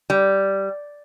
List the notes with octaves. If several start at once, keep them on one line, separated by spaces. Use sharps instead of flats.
G3